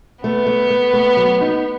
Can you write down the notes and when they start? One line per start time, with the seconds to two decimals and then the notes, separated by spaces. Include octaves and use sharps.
0.23 A3 B3
0.47 A3
0.70 A3
0.93 A3
1.17 F#3
1.41 D#4